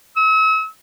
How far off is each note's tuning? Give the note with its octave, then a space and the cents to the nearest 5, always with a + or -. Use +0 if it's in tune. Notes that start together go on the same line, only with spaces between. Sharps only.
E6 -40